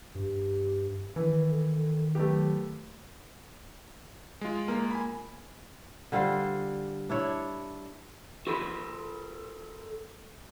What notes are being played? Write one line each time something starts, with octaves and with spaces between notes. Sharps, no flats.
G2 G4
D#3 E3 B4
A4
F#3 A3 B3 G4
G#3 F4
A#3
G#5 B5
D3 G3 F4 C5
D4 E4 C#5
F#4 A4 A#4 B5 C6